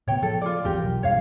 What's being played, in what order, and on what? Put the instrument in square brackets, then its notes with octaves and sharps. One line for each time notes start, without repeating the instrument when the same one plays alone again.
[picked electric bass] A2 C#3 B3 [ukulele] C#5 G5
[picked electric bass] F3 [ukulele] A4
[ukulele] F4 D5
[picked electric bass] G#1 E2 F3 [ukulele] G4 A#4
[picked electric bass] B1
[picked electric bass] E1 G2 [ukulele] C#5 F5